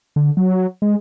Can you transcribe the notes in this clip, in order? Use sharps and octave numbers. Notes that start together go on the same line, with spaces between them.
D3
F#3
G#3